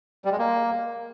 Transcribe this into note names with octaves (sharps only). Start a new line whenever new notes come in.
G3
G#3
A#3